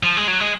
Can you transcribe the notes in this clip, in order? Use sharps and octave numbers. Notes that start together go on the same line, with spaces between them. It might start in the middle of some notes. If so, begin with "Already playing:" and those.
F3
G#3
F#3
G#3